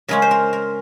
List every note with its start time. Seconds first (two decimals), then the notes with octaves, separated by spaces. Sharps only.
0.08 C#3 G#3 C#4 A#4
0.22 C5
0.31 A#4
0.53 A#4